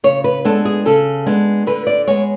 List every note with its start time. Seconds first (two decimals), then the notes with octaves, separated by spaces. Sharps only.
0.04 C#3 C#5
0.24 B4
0.45 G#3 B3 D4 A4
0.65 G#4
0.86 C#3 A4
1.26 G#3 B3 D4
1.67 D3 B4
1.87 D5
2.07 G#3 B3 C#5